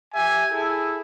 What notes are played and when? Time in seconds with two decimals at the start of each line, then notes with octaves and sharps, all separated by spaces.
0.13 G4 E5 G#5
0.52 E4 G#4 A4